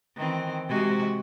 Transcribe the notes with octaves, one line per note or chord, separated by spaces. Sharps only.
D#3 E3 C4
C3 G#3 F#4